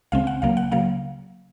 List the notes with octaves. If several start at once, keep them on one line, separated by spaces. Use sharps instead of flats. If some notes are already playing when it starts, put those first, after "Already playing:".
C#2 C#3 G#3 C4 F5
F#5
C#2 C#3 F#3 A#3 F5
F#5
C#3 F#3 A#3 F5